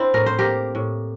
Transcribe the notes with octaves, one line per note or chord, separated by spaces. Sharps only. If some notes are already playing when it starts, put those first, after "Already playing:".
Already playing: C4 D4 E4
A2 A#4
C5
A#3 G4 A#4
A2